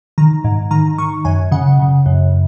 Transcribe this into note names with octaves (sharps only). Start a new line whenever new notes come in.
D#3 A#5
G#2
D#3 A#5
D#3 C#6
F#2 G#5
C#3 F#5
C#3
F#2